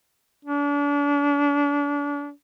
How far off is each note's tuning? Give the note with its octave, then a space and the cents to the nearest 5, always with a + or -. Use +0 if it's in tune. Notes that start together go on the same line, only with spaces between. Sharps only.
D4 -35